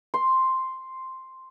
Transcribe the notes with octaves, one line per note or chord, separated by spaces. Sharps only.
C6